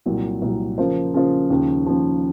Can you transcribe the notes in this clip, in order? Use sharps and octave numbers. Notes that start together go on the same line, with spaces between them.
C2 A#2 F#3
C2 A#2 F#3
C#3 F3 A#3 F4 C5
C#3 F3 A#3 F4 C5
D#2 C#3 F3
D#2 C#3 F3